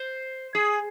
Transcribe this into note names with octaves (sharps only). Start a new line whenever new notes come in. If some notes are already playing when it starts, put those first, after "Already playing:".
Already playing: C5
G#4